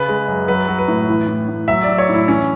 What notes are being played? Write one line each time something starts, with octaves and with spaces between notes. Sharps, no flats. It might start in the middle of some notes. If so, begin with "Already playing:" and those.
Already playing: C#3 B4
G#3
F#2
F#3 B4
F#3
B4
A2
E3
A2
A2
F#3 E5
D5
F#3
C#5
A2
E4
E3 C#4